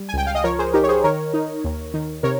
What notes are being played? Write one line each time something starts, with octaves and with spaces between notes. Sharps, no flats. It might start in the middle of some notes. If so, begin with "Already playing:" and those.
Already playing: G3
G#5
C#2 G5
F5
D#5
F3 A#4 C#5
G#4 C5
D#4 G4 A#4
C#5
G#4 C5
D#3 A#4 C#5
D#4
D#2
D#3
C3 A#4 C#5